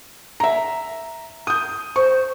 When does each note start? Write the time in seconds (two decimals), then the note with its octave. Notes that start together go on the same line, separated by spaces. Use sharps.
0.40 E5 A#5
1.47 D#6 G6
1.96 C5 C#6